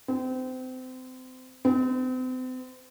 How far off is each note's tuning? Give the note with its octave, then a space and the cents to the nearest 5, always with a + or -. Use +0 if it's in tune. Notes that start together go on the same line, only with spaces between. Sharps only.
C4 -30
C4 -40